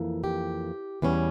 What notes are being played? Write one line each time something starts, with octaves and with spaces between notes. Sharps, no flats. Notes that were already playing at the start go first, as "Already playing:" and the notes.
Already playing: F2 E3 A#3
G4
E2 E3 G3 C#4